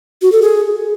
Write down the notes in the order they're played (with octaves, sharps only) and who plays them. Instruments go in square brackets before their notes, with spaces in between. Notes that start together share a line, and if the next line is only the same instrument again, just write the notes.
[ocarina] F#4
A4
G#4